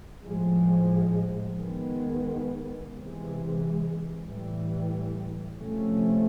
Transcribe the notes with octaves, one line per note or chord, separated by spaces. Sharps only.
A2 F3 G#3
D#3 G#3 B3
C3 E3 G#3
A2 E3 G3
C3 F3 A3 C#4